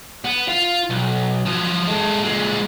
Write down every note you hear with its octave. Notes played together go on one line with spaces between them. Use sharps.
B3
F4
B1
F3 F#3
G#3 A4
A#2 G#3